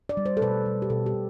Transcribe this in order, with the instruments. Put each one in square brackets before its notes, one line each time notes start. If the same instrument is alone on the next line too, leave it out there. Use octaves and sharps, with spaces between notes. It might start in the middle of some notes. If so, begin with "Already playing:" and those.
[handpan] D5
G3
C5
A4
B2 B4
G3
G4
B2 A4
G4
B2